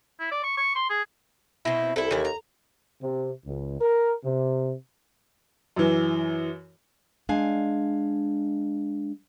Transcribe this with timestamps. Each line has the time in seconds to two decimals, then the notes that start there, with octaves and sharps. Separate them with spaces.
0.20 E4
0.31 D5
0.43 C#6
0.57 C#6
0.75 C6
0.90 G#4
1.65 B2 C4 E4
1.96 C2 E4 A4
2.11 D#2 E3 E4
2.25 A#5
3.02 C3
3.45 C#2
3.80 A#4
4.24 C3
5.76 F#2 E3
7.29 G#3 D4 F5 G#5